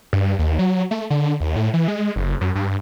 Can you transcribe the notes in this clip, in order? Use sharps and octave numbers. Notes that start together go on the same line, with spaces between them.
G2
D#2
F#3
A3
D3
D#2
A2
E3
G#3
F#1
F#2
G2